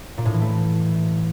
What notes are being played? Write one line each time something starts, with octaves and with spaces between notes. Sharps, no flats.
A#2
A2
E3
A3